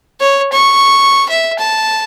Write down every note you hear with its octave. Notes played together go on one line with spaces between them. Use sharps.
C#5
C#6
E5
A5